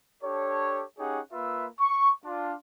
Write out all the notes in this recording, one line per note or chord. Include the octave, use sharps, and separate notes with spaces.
D4 G4 A4 C#5
C#4 D#4 G4 G#4 C#5 F#5
A#3 F4 B4 E5
C#6
D4 F4